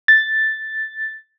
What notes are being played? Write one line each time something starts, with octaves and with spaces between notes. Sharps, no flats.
A6